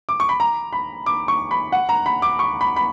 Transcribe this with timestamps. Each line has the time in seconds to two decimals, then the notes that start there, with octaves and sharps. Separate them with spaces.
0.09 D6
0.20 C#6
0.29 B5
0.40 A#5
0.73 B5
1.06 D6
1.28 C#6
1.51 B5
1.72 F#5
1.89 A#5
2.06 B5
2.22 D6
2.39 C#6
2.61 B5
2.76 B5